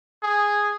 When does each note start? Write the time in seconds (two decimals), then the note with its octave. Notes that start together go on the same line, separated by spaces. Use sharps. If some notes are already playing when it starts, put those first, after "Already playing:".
0.23 G#4